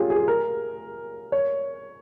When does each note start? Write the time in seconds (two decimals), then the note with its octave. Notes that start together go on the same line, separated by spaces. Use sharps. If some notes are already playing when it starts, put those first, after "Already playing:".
Already playing: C#4 F4 G4 G#4
0.10 G#4
0.28 A#4
1.32 C#5